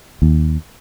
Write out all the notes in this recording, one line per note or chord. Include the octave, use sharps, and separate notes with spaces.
D#2